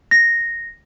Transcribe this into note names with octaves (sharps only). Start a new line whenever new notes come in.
A#6